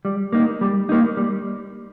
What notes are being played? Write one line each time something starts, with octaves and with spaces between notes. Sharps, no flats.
G3
A#3 D#4
G3
A#3 D#4
G3